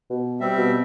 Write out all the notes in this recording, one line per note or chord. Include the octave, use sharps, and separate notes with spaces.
B2
G3 C4 E5
B2